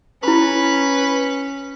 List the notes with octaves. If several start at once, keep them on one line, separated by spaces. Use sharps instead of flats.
C#4 E4 B4 B5